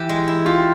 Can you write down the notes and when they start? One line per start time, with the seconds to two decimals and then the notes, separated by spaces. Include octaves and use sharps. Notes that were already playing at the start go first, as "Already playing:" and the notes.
Already playing: E3 G4
0.09 G#3
0.28 E4
0.46 F4 G4